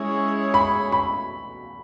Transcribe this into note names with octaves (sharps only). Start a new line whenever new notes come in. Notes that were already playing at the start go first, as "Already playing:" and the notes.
Already playing: G#3 C#4 E4 G#4 C#5 C#6
B5
B5